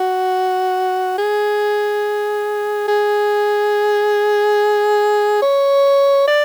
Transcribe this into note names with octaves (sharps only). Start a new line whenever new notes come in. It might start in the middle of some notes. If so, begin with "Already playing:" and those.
Already playing: F#4
G#4
G#4
C#5
D5